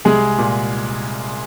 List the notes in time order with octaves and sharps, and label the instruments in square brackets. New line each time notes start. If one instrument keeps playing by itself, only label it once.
[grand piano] C2 G#3 G#4
A#2